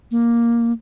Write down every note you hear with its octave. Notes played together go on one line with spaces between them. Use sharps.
A#3